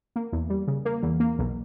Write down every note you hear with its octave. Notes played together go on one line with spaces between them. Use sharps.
A#3
E2
G3
C#3
A#3
E2
A#3
B1